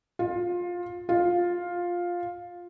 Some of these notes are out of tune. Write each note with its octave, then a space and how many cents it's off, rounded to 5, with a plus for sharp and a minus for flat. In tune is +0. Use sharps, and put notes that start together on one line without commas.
F4 +20
F4 +10